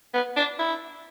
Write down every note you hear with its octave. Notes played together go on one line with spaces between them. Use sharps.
B3
D4
E4